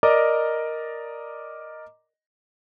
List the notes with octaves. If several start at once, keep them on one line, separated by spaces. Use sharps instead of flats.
A#4 D5 D#5 A#5 D6